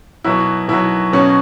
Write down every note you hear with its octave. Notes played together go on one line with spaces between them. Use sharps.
B2 F#3 E4
B2 F#3 E4
B2 F#3 C#4